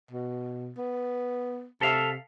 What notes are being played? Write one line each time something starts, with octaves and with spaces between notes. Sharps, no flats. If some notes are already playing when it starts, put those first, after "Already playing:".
B2
B3
C3 A4 E5 F5